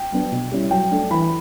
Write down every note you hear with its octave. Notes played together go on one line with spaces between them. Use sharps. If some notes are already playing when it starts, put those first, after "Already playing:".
Already playing: G5
F#3 B3 D4
B2
G3 C#4 E4
F#3 G5
A3 D4
E3 B5